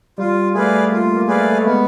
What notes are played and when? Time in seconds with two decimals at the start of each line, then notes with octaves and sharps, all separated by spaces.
0.18 G3 F4
0.54 A3 G#4 B4 D5 F5
0.92 A#3 F4
1.17 A#3
1.28 G#4 B4 D5 F5
1.41 A3
1.60 A3
1.64 G#3 B3